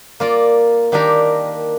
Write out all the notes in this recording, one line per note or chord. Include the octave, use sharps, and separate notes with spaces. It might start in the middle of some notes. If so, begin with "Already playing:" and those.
A#3 F4 A#4 D5
D#3 A#3 D4 G4 A#4